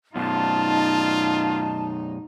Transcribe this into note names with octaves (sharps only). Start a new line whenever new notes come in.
F#2 B2 D#4 F4 A5